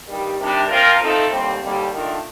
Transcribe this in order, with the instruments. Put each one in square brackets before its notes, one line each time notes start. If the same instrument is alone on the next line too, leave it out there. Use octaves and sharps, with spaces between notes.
[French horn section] G2 D#3 G3
C3 D#3 G3 D4 G4
F3 C4 F4 A#4
F3 A3 C4 D#4 A4
D#2 D3 G3 C4
D#2 D3 G3
D#3 A3 D4 F4 A#4